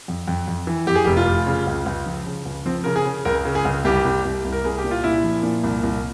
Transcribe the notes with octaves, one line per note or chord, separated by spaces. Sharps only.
F2
F2
F2
E3
F2 G4
G#4
F1 G4
F4
F1
C#3
C#2
C#2
F3
C#3
C#2
F3 C4
C#3 A#4
G#4
C#3
C#2 A#4
C#3
G#4
C#2
C2 G4
C2
C2
C2
A#4
C2 G#4
G4
A#2
F4
A#2 E4
F3
A#2
C2
C2